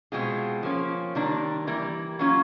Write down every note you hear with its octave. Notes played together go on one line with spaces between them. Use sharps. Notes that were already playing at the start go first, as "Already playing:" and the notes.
B2 G#3 C4 F4 G#4
F3 A#3 C#4
C3 D#3 G3 A#3 D4
E3 G3 A#3
F#3 A#3 C#4 F4